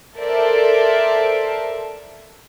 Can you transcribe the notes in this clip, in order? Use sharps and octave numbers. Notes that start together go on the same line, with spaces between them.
A4 A#4 C5 D5 E5 A5